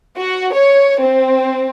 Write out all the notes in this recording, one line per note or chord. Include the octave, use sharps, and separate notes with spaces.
F#4
C#5
C4